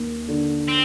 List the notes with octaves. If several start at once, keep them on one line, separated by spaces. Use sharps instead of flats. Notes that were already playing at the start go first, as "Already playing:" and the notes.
Already playing: D#2
D3
C4